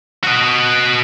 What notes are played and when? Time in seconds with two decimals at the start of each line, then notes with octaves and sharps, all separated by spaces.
0.24 F#4 D#5